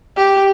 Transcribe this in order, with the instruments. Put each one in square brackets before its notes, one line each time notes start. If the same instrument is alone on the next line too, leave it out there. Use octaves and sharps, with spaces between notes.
[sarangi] G4